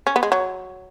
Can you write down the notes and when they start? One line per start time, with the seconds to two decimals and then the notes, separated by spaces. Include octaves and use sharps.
0.07 C#4
0.16 B3
0.23 G#3
0.32 F#3